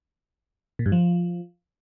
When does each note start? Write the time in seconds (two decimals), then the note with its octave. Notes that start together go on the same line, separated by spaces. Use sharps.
0.79 A#2
0.86 G2
0.92 F3